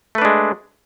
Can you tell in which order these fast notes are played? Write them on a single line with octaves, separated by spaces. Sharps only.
A3 B4 D4 G#3